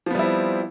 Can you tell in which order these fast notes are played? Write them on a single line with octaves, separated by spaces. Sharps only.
F3 B3 G3 E4 C4